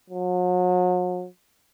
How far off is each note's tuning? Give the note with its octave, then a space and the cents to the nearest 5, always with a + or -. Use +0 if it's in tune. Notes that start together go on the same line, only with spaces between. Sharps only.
F#3 -40